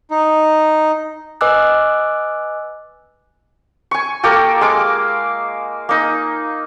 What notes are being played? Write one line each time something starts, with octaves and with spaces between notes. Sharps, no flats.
D#4
B4 D#5 G#5 D6 E6 F#6
G#5 C#6
A#3 G4 A4 G5
G#3 F5 D6
A#3 D#4